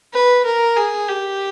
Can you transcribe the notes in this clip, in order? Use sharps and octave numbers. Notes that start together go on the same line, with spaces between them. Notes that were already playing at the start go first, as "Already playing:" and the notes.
B4
A#4
G#4
G4